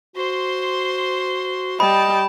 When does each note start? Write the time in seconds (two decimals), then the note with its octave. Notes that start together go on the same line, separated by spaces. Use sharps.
0.16 F#4 C5 C6
1.80 G3 D#5 G5 A5 B5